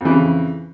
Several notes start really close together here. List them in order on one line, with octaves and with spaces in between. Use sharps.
F2 E3 C#3